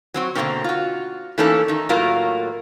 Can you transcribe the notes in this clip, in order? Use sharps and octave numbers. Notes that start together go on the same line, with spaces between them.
F#3 C4 F#4
B2 D3 D#3 A#3 C4 C#4
F4 F#4
E3 A3 A#3 C#4 D#4 A4
D#3 D#4
A2 F#3 A3 A#3 F4 A#4